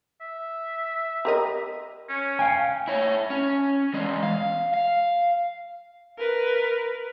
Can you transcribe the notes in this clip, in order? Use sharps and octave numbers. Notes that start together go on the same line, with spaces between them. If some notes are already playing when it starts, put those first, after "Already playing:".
E5
G4 A#4 D#5
C#4
F5 G5 G#5
E4 C#5
C#4
E3 G#3
F5
F5
A#4 B4